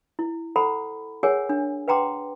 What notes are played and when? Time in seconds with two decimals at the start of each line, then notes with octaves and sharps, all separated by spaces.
0.19 E4
0.56 A4 C5 F#5 A#5 B5
1.23 G#4 A#4 C#5 F#5 G#5
1.49 D4
1.88 B4 F#5 G5 A#5 C6 D6